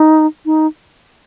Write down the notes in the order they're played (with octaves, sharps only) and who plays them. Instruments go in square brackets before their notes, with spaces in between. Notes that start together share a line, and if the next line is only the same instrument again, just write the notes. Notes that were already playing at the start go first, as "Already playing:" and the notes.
Already playing: [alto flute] D#4
D#4